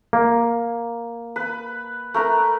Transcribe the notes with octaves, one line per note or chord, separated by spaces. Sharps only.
A#3
B4 B5
A3 A#4 B4